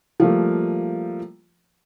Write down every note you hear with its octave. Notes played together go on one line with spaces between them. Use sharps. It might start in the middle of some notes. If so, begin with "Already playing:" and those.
F3 G3 A3 A#3